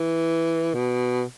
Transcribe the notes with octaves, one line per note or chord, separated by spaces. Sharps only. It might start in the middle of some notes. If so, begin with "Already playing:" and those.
Already playing: E3
B2